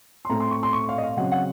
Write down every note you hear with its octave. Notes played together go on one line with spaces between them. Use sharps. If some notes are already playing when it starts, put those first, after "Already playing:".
C6
A2 A3 C4 A#5
C6
C#6
C6
C#6
F5
D#5
F5
C#3 F#3 C4 F#5
F#5